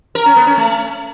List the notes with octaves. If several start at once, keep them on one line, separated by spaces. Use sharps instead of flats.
A#4
C#4
B3
C#4
A3